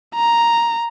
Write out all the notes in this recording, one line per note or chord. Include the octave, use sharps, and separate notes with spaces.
A#5